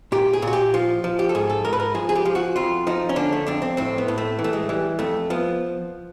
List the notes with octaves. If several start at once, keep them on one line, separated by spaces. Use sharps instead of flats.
A#2 G4
G#4
A#2
F#4
G4
F3 F4
F3
G4
A4
G#2 G#4
A4
G#2 A#4
B4
A#4
F3 G#4
G#4
G4
F3
F#4
F2 F4
F3 D#4
C#4
D3 D4
A3
F2 D4
C4
A2 C4
B3
A2
A3
E3
A3
G#3
E3 G3
F2 A3
F3 B3